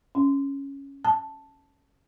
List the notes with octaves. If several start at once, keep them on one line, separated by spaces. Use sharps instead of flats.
C#4
A5